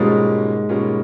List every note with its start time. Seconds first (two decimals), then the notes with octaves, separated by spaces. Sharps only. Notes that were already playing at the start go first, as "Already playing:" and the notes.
Already playing: G#2 B2 G3 A#3 C#4 F4
0.69 B2 G3 A#3 C#4 F4